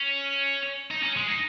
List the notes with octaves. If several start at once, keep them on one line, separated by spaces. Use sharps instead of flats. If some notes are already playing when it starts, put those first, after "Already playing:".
Already playing: C#4
D#4
C#4
G#3
D#4